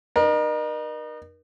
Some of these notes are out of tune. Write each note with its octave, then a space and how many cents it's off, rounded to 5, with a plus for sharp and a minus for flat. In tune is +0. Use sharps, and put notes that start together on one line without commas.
D#4 -35 A#4 +35